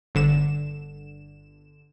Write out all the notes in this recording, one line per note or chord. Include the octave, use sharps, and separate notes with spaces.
G1 D3 E7